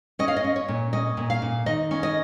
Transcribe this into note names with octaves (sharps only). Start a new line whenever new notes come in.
C#4 D#5
F5
D#5
C#4
C#5
A#2
C#4 D#5
A#2
F5
A#2
D#3 D#5
C#4
D#5